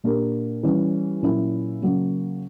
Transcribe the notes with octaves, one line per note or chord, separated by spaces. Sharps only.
A#2 A#3 D4 G4 A#4
E3 G3 C#4
A#2 F#3 C#4 E4
C#3 F#3 A#3